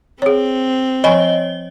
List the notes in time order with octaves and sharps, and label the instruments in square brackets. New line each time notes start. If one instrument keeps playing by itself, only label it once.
[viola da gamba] C4 [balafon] G#4 C#5
[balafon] F3 G#5 B5 [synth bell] C#5 D#5 G7